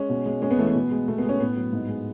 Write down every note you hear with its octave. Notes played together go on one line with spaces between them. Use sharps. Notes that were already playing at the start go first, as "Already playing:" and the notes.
Already playing: G#3 C#4
B2
G#3
G#3 C#4
B3
E3 A3
B3
B2
G#3
B2 A3
B3
G#3
C#4
A2 B3
F#3
G#2
G#3